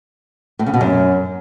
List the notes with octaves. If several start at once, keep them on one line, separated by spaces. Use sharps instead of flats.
A2
C#3
B2
F#2